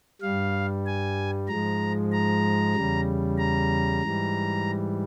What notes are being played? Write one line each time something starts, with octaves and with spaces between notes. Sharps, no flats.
G2 G3 F5
G#5
G#2 F3 G#3 A#5
A#5
E2 C#3 G3
A#5
G#2 E3 G3